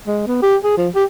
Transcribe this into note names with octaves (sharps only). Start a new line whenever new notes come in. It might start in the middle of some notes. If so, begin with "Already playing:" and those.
G#3
B3
G4
G#4
F3
G4